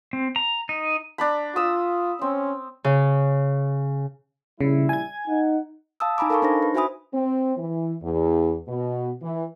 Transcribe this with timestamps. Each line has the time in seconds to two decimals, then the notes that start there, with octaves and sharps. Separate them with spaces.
0.13 C4
0.36 A#5
0.69 D#4
1.18 D4 A#5 B5
1.56 F4 D#6 E6
2.21 C4 C#4
2.84 C#3
4.61 A#1 C#3 G3 E4
4.89 G#5 G#6
5.27 D#4 F#5
6.00 F5 A5 D#6 E6
6.18 D#4 G#5 A#5 B5 D6
6.30 A4 A#4 F5 A5 B5 C#6
6.42 D4 D#4 C5 A#6
6.62 B4
6.75 F#4 C5 E5 G#5 B5 D#6
7.13 C4
7.57 E3
8.02 E2
8.68 B2
9.22 E3